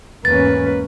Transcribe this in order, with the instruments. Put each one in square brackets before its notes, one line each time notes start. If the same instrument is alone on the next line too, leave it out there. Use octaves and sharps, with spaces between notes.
[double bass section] E2 G#2 C#4 [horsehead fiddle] A#3 B4 [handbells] A6